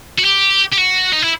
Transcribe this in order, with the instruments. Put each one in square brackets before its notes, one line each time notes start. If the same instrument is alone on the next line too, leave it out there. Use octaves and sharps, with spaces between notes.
[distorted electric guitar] F#4
G4
G4
F#4
D#4
E4